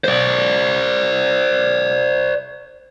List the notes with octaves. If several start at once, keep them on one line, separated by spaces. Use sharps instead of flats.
C5 D5